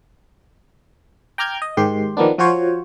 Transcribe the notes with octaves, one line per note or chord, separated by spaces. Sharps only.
G5 A#5 D6 F6 G6 G#6
D#5
G#2 D#3 G4 C6
D#3 F3 A#3 B3 D4
F3 F4 F#4 C5 C#5